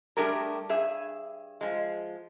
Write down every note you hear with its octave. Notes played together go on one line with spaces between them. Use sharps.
G3 A3 D4 G4 G#4 A#4
G2 G#4 E5
F3 G#3